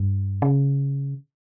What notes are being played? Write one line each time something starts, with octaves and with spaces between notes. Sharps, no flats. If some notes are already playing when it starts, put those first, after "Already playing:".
Already playing: G2
C#3